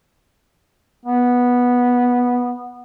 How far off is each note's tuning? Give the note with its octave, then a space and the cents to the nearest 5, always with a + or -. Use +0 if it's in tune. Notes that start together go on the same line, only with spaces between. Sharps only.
B3 -10